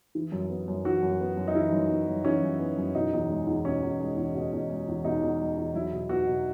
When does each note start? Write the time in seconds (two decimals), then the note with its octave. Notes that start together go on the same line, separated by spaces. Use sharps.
0.15 E3
0.32 F#2
0.50 B3
0.68 F#2
0.85 E3 F#4
1.03 F#2
1.21 B3
1.37 F#2
1.48 D#4
1.55 E3 E4
1.73 F#2
1.90 B3
2.08 F#2
2.25 E3 C#4
2.42 F#2
2.60 B3
2.77 F#2
2.95 B2 D#4
3.13 E2
3.30 G#3
3.47 E2
3.65 B2 C#4
3.83 E2
4.00 G#3
4.17 E2
4.35 B2
4.53 E2
4.69 G#3
4.88 E2
5.05 B2 D#4
5.22 E2
5.40 G#3
5.57 E2
5.74 F#3 E4
5.92 B2
6.09 B3 F#4
6.27 B2